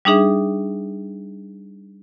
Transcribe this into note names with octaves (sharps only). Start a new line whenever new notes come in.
G3 D4 D#4 G#4 E5